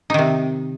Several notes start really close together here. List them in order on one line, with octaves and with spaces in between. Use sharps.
D#4 D#3 C3